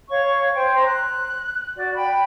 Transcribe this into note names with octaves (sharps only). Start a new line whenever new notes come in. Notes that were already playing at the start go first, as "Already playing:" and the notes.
C#5 F5 C#6
C5 G5
A#5 C6
F#6
F#4 D5
G5 B5